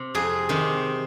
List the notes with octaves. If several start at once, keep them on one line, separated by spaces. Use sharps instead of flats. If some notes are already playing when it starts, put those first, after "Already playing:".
Already playing: C3
F2 G#4
C3 D#3